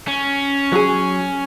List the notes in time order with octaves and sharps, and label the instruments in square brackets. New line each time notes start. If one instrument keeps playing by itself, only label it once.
[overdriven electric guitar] C#4
[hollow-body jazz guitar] F#3 G#4